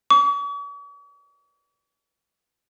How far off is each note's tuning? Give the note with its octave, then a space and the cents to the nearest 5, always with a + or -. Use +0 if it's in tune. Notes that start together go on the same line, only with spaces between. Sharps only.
C#6 +45